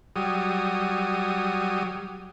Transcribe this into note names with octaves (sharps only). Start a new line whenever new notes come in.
F#3 G3 D#6